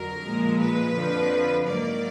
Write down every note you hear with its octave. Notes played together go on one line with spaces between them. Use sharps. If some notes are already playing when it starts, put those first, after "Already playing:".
Already playing: F2 D3 F#3 A#4
A#2 F3 G#3
B4
F2 D3 F3
G#2 F#3 A#3 D#4 D5